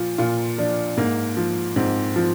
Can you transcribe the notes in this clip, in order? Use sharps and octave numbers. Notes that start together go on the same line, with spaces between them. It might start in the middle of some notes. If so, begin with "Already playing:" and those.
Already playing: A#2 F3 F4
A#2 F4
F3 D4
G#2 A#3
F3
G#2 C4
F3